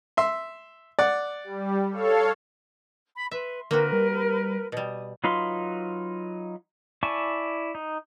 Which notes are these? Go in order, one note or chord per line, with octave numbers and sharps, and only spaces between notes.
E5 C6
D5 F#5
G3
A4 C#5 F5
B5
B4 E5 C6
D3 A#3 C4 F#4 A#4 B4
G3
B2 G3 D#6
F#3 D#4 F4 B4 C6
E4 D5 G#5 A5 C#6
D#4